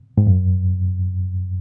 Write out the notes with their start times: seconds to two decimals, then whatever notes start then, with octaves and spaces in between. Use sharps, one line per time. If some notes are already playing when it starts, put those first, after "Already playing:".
0.18 G#2
0.27 F#2